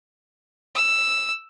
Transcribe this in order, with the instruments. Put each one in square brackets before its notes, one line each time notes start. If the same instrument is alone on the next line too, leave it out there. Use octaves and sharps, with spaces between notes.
[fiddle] E6